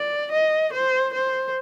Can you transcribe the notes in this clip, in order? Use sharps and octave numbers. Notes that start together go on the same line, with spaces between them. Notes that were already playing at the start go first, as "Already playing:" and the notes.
Already playing: D5
D#5
C5
C5